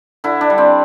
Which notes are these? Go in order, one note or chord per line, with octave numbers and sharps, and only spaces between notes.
D3 E4
D4
G3
C4